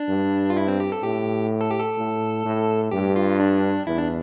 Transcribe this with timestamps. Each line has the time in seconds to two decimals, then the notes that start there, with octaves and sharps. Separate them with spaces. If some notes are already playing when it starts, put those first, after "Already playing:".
Already playing: D4
0.09 G2
0.50 F4
0.57 E4
0.68 C4
0.80 G4
0.92 A4
1.03 A2 G4
1.61 A4
1.71 G4
1.80 A4
1.98 A2
2.45 A2
2.91 G2 G4
3.16 F4
3.40 D4
3.86 E2 E4
3.97 D4